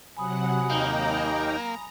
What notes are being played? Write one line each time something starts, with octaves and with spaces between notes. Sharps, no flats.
C3 F#3 F#5 G#5 B5 D#6
D#2 A#3 D#4 G5 A#5